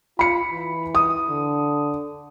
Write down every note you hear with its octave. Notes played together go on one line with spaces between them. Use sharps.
F4 B5 C#7
E3
D#6
D3